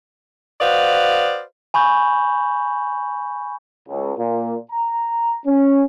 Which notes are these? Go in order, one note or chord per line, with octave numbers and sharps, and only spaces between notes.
F#4 B4 C5 D5 D#5 F5
G#5 B5 C#6 G6
C#2
A#2
A#5
C#4